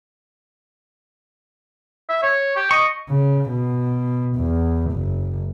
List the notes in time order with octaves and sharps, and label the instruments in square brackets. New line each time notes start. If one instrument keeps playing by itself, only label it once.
[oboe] E5
C#5
G4
[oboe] D#5 [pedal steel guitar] C#6
[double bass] C#3
B2
E2
F#1